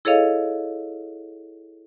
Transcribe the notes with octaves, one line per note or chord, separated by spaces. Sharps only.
E4 G#4 A4 C#5 D#5 F5